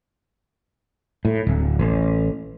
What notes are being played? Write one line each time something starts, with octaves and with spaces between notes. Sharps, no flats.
A2
D1
A1